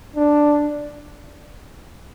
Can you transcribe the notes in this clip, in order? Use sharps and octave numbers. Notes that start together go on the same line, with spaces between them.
D4